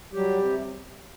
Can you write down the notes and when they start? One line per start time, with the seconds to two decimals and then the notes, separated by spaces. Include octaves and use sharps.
0.13 F#3 G3 G4
0.38 C3